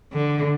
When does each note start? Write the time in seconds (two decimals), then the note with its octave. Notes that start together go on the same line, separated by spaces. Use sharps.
0.13 D3